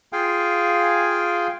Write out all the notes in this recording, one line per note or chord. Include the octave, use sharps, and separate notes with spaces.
F4 G#4 F5 G5 G#5